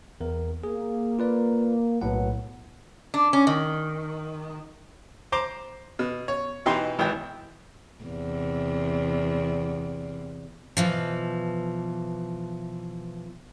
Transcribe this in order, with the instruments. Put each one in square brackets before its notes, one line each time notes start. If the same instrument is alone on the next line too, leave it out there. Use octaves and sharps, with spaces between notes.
[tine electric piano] E2 A#4
[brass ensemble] A#3 [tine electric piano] G#4
[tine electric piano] F4 B4 D5
[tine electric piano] B1 A2 F#5 [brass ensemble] F#3 B3
[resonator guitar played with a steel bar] D4
C#4
D#3
[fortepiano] C5 A#5 C6 D6
B2
C#5
B2 E3 D#4 G4 C6
G#1 E3 G5
[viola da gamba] E2 C3
[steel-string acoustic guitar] B2 E3 F3